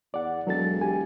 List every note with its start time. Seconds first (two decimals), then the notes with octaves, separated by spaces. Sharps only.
0.14 E2 D5 F#5
0.47 E1 F#3 A4 A6
0.81 G4 G#5